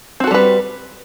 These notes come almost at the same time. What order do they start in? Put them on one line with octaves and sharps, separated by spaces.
C4 F#4 A4 G3 B4